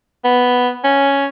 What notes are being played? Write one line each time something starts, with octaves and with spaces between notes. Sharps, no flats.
B3
C#4